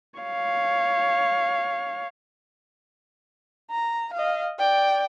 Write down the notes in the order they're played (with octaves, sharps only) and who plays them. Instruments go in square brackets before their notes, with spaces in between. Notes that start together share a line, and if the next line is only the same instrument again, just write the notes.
[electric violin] C#5 F5
[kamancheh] A#5
D#5 F5
D5 G5